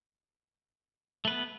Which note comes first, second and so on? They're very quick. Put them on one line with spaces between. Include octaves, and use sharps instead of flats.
A3 B4 B3